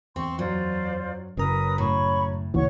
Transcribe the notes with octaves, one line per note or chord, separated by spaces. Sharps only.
E2 C4 C6 C#6
F#2 F#3 F4 C5 D5
F#1 F#3 C#4 A#4 B4 A#5 D#6
A2 C#5 B5 C#6
C#2 A#2 E3 C#5 F#5 C#6